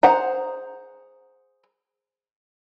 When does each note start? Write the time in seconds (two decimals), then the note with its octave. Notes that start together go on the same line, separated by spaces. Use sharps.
0.03 G#4 C5 F#5 A#5